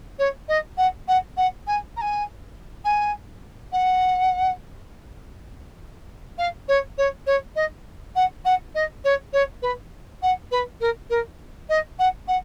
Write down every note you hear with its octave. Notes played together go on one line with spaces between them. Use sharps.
C#5
D#5
F#5
F#5
F#5
G#5
A#5
G#5
G#5
F#5
F5
C#5
C#5
C#5
D#5
F#5
F#5
D#5
C#5
C#5
B4
F#5
B4
A#4
A#4
D#5
F#5
F#5